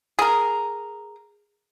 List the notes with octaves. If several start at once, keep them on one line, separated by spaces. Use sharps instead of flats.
G#4 A#4